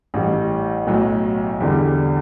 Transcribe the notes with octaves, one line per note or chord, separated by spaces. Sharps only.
A1 A2 G3
B1 A2 F#3
E2 D3 G3